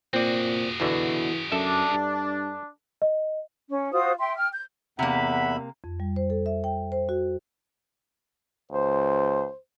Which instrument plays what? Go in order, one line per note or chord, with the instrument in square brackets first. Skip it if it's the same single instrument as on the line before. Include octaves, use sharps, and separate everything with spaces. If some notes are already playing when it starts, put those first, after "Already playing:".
[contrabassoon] A#2 [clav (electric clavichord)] C4 D5 [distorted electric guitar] F#4 G#4
[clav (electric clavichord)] E2 B2 D3 [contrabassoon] E3
[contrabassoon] F#2 [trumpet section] D4 [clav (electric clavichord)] A4 E5
[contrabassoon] G2
[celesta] D#5
[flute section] C#4
F4 F#4 C5 D#6
E5 G5 C6
G5 F6
G6
[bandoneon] E2 E5 B5 [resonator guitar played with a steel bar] C3 A#3 [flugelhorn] F#5
[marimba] F2
G3
C5
A4
E5
G5
C5
F#4
[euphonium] C#2 [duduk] C5